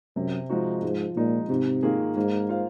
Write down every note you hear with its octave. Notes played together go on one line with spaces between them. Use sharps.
F#2 C3
F3 G#3 D#4 F#4
G#2 F3
A#2 G#3 D#4
G#2 C3
D#3 A#3 F4 G#4
G#2 A#3
F4 C5 F5